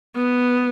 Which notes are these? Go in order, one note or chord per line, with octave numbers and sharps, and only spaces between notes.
B3